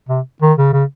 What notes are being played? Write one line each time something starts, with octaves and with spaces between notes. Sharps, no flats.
C3
D#3
C#3
C#3